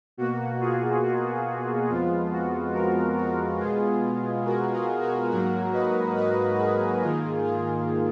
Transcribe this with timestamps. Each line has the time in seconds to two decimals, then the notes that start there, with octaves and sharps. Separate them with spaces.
0.17 B2 A#3 F#4
0.60 F4 G#4
1.03 F#4
1.89 F2 F3 G#3 B3 F4
2.31 F#4
2.74 F#4 A#4
3.17 F#4 A#4
3.60 B2 G#3 B3 F4 G#4
4.45 F#4 A#4
4.73 F4 G#4
5.02 F#4 A#4
5.31 G#2 F#3 A#3 F#4 A#4
5.73 B4 D#5
6.16 B4 D#5
6.59 G#4 B4
7.01 G#2 D#3 A#3 F4 G#4
7.44 F4 G#4